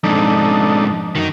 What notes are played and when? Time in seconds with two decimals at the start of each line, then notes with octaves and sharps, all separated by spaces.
0.04 F2 G#2 D4 D#4 A4
1.15 F#2 D#3 D#4